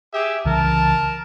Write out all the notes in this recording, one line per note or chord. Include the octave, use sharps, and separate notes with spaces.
G4 G#4 E5
C2 C#3 E3 A#4 A5